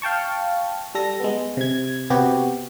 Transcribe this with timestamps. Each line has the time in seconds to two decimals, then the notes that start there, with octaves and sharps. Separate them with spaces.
0.02 F5 G5 A5 C#6
0.95 G3 A4 A#6
1.20 G#3 B3
1.57 C3 G#6
2.10 C3 B3 F#4 G4